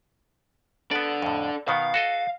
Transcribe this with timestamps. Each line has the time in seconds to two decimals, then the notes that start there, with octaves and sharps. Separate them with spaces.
0.91 B3 D4 A4 D5
1.22 F2 A2
1.68 B2 D#3 B3 F5
1.94 F#4 A4 D#5